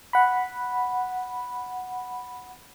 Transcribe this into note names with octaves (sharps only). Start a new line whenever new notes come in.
F#5 B5